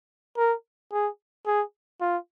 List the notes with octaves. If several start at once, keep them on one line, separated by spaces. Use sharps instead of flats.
A#4
G#4
G#4
F4